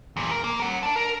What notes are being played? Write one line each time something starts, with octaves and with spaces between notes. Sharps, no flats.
E2 A#2
A#4
A#3
A#4 F#5
D5 A5
A#4